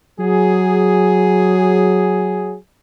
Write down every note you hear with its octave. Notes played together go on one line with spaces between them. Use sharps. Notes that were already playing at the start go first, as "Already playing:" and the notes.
F#3 G#4